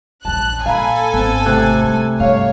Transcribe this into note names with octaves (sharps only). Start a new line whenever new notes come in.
A#1 E2 A5 F#6
A#2 A4 F5 G#5 A#5 B5
G#1 B3 C4
A2 C3 F#6
G#3
G2 C#5 F5